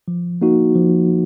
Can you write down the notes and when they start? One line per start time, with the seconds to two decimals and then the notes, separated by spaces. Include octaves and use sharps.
0.08 F3
0.41 A#3 D#4 F#4
0.75 F3